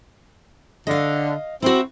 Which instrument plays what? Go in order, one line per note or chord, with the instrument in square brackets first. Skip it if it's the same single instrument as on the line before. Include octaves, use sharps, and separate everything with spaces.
[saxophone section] D3 [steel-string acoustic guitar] D#5 F5
[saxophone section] C4 [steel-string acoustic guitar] E4 F#4